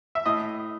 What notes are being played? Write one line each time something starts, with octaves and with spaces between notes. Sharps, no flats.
E5
A2 D#5